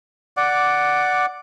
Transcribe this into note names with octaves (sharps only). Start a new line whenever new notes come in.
D5 F#5 D6